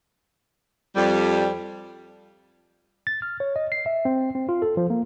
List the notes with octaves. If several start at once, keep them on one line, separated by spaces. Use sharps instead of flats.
F2 G3
A6
F6
C#5
D#5
C7
E5
C4
C4
F4
A4
F3
A#3